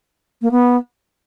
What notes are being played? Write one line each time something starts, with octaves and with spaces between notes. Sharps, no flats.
A#3
B3